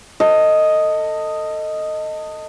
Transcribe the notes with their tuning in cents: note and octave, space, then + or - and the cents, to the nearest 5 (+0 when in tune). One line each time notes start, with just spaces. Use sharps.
A4 +30 D#5 +0